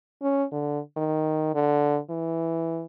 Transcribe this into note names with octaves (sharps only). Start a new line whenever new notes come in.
C#4
D3
D#3
D3
E3